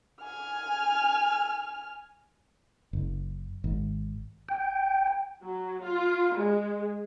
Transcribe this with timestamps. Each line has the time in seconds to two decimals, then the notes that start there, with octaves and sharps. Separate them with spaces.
0.23 G#5 F6
2.93 F#1
3.64 G#1
4.49 G5
5.41 F#3
5.85 F4
6.35 G#3